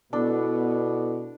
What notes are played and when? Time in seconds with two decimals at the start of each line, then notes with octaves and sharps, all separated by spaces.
0.13 B2 B3 D4 E4 A4